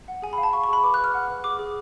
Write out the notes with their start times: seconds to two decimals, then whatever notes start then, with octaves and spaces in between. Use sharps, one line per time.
0.08 F#5
0.22 G#4 G#5
0.33 B5
0.38 F5
0.43 A5
0.53 F5 C#6
0.64 C#6
0.68 G#4 B5
0.83 B4 D6
0.94 F#6
0.99 B4
1.04 F6
1.14 F#5
1.29 B4
1.44 G#4 D6
1.59 G#4